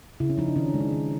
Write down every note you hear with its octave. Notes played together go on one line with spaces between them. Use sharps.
C#3 E4
C#4
F3 D#4
D4
D#3 C#4
D4
G#3
D#4
D#3